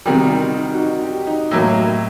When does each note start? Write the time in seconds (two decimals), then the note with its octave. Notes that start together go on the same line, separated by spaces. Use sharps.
0.06 C3 D#3 G3 F#4
0.30 D#4
0.54 D#4
0.74 F#4
0.78 D#4
1.02 G4
1.27 D#4
1.51 A2 F#3 A#3